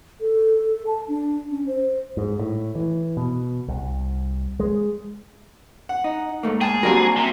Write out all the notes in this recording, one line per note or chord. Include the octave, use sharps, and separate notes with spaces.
A4
A5
D4
C#4
C5
G#2
A2
E3
B2
C2
G#3
F#5
D#4
G#2 A3 A#3
G#4 G5 A5
F#3 G3 A#3 C4 D4 A#4
C3